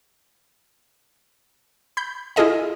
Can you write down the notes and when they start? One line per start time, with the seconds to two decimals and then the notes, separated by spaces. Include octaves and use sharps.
1.97 B5 G6
2.36 E4 F4 G#4 A4 D#5 F5